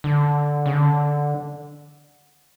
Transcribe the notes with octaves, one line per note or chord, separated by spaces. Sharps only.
D3
C#3
D3